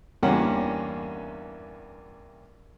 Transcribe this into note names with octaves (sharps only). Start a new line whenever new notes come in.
E2 G2 A#3 C#4 F#5